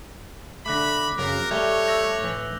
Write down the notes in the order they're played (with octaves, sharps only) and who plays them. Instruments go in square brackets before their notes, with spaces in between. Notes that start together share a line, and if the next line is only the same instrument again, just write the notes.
[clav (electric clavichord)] D3 A3 [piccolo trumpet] B5 [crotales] D6 F#6 A#6
[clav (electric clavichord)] F#2 C#3 F5 [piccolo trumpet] A#4
[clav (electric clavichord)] G3 [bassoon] A3 [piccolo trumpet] C#5 [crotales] G6 F7 G7
[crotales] E6 A#6 F7
[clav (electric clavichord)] A2 E3